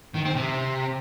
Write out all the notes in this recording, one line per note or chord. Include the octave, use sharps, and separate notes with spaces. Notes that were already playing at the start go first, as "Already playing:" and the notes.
D#3
C4
C3